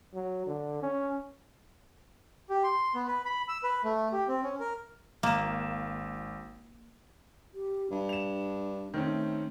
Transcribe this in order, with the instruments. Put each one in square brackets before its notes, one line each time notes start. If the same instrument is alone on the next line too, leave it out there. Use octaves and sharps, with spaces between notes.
[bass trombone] F#3
D3
C#4
[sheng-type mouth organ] G4
C6
B3
B4
B5
E6
B4
A3
G4
C4
C#4
A#4
[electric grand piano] G#1 E7 [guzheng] A#3
[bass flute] G4
[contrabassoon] G2 [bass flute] D4
[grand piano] E7 F7
[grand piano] D#3 C4 C#4 [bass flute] A3